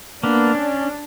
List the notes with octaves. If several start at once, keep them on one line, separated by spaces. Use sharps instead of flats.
A#3 B3 D4
C#4